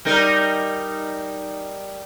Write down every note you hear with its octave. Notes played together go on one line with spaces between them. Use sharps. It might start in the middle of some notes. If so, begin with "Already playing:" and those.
G3 D#4 A#4